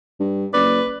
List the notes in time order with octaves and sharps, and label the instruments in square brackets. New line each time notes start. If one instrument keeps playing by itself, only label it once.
[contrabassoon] G2
[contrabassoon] F#1 [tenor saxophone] B4 [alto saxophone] D5